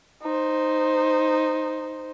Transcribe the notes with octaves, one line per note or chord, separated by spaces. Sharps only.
D#4 C5